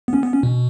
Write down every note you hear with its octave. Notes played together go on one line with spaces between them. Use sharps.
B3
C#4
B3
C#4
B2